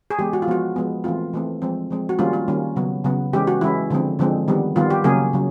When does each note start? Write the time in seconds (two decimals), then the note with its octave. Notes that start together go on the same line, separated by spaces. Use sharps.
0.10 G#4
0.19 E3 G#3 B3 G4
0.33 F#4
0.42 F4
0.48 F3 G#3 B3 F#4
0.76 F3 G#3 B3
1.04 E3 A3 C4 F4
1.33 E3 A3 C4
1.62 F3 G#3 C4
1.90 F3 G#3 C4
2.09 F#4
2.19 D#3 G3 A#3 C#4 F4
2.33 F4
2.48 D#3 G3 A#3 C#4
2.76 C#3 F#3 B3
3.04 C#3 F#3 B3
3.33 E3 G#3 C#4 G4
3.47 F#4
3.61 E3 G#3 C#4 E4
3.90 D3 F3 G#3 C4
4.19 D3 F3 G#3 C4
4.48 D#3 G3 B3
4.76 D#3 G3 B3 F4
4.90 G4
5.04 C#3 F#3 A#3 C#4 G#4
5.33 C#3 F#3